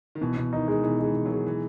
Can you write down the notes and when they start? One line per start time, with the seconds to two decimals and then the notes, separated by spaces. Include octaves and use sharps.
0.15 D#3
0.21 B2 E3
0.37 B2
0.53 D#3 D#4
0.68 G#3
0.83 B2 E3
0.99 E3 G#3
1.15 B2
1.25 D#3 F#3
1.31 G#3
1.46 E3